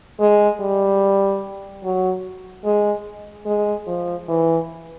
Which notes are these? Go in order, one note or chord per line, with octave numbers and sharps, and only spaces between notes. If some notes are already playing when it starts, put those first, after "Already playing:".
G#3
G3
F#3
G#3
G#3
F3
E3